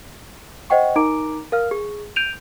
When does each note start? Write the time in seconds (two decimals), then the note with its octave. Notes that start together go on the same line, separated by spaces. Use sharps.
0.70 C5 D#5 F#5 G5 C#6
0.96 D#4 A#4 A#5 D6 D7
1.52 A#4 F5 F6
1.71 G#4
2.16 G6 D7 D#7 F7